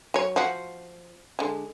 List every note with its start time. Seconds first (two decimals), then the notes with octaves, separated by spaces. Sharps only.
0.14 F#3 C#5
0.36 F3 F#4
1.39 D3 G#3